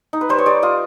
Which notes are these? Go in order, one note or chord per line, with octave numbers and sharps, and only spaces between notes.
D#4
B4
G3 C5
C#5
G3 D5
F4 D#5